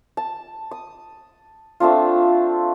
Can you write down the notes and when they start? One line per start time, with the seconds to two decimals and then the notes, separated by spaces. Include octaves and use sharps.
0.17 A5
0.71 D#6
1.80 A3 C4 D4 F4